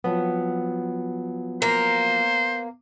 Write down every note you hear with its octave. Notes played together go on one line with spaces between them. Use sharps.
F3 F#3 B3 C4
A#3 C5